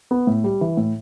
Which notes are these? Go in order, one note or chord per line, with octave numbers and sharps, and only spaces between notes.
B3
A2
G3
E3
A2